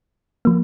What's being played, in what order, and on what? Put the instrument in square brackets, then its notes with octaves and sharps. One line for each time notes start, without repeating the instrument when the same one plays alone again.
[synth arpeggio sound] F3 A#3